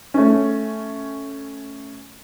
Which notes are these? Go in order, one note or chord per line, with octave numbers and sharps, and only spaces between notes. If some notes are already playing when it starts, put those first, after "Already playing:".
A3 C#4